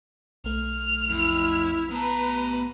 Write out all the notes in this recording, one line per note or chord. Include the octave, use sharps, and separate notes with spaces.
B1 A3 F6
F2 E4
B3 B4 A5 A#5